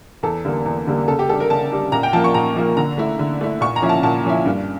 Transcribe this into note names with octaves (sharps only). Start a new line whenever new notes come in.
E2 A4
D3 G3 A#3
E2
D3 G3 A#3
C#3 A4
G4
G3 D4 A4
A#4
C#3 A5
G3 D4
A#2 A#5
G5
F3 A#3 A5
C#6
A#2 A#5
F3 A#3
D3 A#5
A3 E4
D3
A3 E4
A#2 C#6
A#5
F3 C#4 E4
A5
A#2 A5
F3 C#4 E4
G2